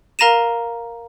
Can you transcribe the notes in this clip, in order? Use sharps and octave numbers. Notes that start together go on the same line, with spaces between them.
A#4 F5 A#5 A#6 D#7 E7